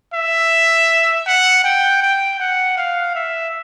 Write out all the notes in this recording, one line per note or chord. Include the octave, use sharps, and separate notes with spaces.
E5
F#5
G5
G5
F#5
F5
E5